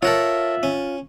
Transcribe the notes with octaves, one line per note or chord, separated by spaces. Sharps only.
F4 A4 A#4 C#5 E5 F#5
C#4